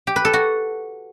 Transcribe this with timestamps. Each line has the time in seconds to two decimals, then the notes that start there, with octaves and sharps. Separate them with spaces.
0.07 G4
0.16 B4
0.25 A4
0.33 F#4